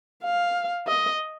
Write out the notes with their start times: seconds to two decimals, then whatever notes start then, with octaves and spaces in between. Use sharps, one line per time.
0.24 F5
0.87 D#5